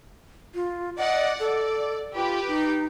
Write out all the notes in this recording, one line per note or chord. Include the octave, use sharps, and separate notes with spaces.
F4
D5 D#5 F#5
A4 D5
F4 G4 B4
D#4